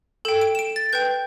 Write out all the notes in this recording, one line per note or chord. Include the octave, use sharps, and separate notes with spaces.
A4 G5 E7
D7
E7
D7
A6
B4 G5 G6